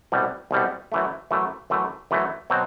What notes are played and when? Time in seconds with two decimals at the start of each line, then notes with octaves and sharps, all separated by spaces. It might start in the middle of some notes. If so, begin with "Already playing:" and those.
0.12 C2 B2 G3
0.51 C2 B2 G3
0.92 F#2 E3 A3
1.31 F#2 E3 A3
1.70 F#2 E3 A3
2.11 F#2 E3 A3
2.50 B2 F#3 C4